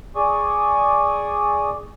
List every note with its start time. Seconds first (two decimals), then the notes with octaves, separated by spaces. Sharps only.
0.15 G#4 D5 C#6 D#6